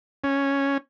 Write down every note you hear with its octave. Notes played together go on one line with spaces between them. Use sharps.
C#4